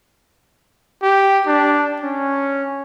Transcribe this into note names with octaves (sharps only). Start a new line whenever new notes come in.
G4
D4
C#4